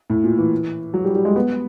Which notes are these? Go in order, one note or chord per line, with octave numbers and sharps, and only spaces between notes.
A2
A#2
E3
F#3
G3
G3
G#3
B3